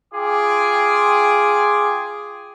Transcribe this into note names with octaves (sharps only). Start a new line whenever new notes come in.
F4 G#4 G5 D6